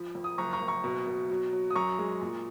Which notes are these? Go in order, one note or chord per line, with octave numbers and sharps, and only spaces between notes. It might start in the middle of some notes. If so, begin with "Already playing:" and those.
Already playing: F3 B5 D#6
F2
D#6
F#1 A#5 C#6
A#5 C#6
F#1
A#5 C#6
B2
B2
F#3
F#3
D#6
F#2 A#5 C#6
G#3
A#2